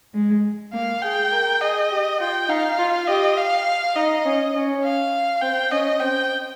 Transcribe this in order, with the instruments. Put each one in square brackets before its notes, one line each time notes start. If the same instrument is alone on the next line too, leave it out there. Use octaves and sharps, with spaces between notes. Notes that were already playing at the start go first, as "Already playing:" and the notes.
[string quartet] G#3
[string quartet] A#3 [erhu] F5
[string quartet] G#4 [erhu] G5
[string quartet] A#4
[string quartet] G#4 [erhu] D#5
[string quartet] G4
[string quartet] F4 [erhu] G5
[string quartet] D#4 [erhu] F5
[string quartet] F4
[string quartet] G4 [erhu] D#5
[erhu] F5
[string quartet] D#4 [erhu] D#5
[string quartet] C#4
C#4
[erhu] F5
[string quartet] C4 [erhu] G5
[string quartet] C#4 [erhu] D#5
[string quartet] C4 [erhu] G5